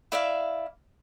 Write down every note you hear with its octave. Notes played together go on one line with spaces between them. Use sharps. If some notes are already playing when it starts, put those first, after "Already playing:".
E4 D5 E5 F5